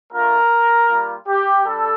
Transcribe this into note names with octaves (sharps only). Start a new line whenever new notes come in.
A3 D4 F4 A#4
G3 A#3 F4
G4
G3 D4 A4